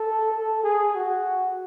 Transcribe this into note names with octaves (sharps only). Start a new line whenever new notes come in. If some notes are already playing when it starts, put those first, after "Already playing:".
Already playing: A4
A4
G#4
F#4